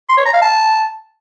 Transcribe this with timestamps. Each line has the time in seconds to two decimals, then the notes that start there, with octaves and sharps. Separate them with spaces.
0.09 C6
0.17 C#5
0.25 A#5
0.34 F5
0.42 A5